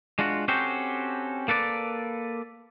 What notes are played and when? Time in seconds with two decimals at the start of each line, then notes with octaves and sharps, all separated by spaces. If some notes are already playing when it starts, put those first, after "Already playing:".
0.19 G#3 D4 F4 F#4
0.48 C4 C#4 F#4 G4 A4 C5
1.48 A#3 A4 B4 D5